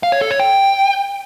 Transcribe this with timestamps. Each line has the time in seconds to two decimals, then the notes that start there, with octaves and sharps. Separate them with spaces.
0.03 F5
0.12 C#5
0.21 A4
0.30 C#5
0.40 G5